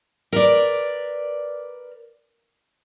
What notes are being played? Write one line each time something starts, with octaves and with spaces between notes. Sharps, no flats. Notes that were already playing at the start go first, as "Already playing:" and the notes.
A#4 B4 D5